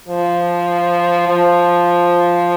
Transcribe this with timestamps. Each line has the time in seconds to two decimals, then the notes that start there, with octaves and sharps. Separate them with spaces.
0.08 F3
1.27 F3